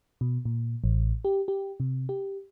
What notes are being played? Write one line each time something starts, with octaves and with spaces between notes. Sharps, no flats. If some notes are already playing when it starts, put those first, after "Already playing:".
B2
A#2
A1
G4
G4
C3
G4